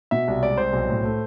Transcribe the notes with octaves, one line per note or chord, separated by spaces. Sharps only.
B2 E5
C2
G#3 D5
C2 C5
B1
A2
A3